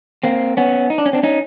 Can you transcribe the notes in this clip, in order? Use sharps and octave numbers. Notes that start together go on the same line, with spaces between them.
A#3 C4
B3 C#4
D#4
D4
C#4
C4 D4
C#4 D#4